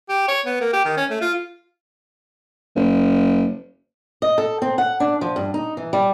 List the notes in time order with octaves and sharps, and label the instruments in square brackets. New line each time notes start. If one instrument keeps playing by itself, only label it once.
[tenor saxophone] G4
C#5
B3
A#3
G4
D#3
C#4
A3
F4
[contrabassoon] F#1
[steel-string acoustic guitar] D#5
A4
C4
F#5
D4
F3
G2
D#4
E3
G3